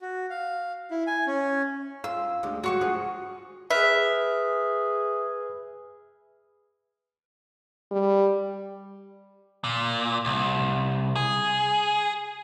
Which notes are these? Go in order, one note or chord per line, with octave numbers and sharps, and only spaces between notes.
F#4
F5
E4
G#5
C#4
F4 E6
D2 G#3 G4
F#3 G#3 F#4 G4 C#6
D2 F3 G#4
G#4 B4 E5 F6
G3
A#2
C2
G#4